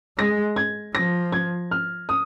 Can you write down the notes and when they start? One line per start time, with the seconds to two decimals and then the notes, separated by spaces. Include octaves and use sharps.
0.18 G#3 A#6
0.56 G#6
0.95 F3 A#6
1.32 G#6
1.71 F6
2.09 D#6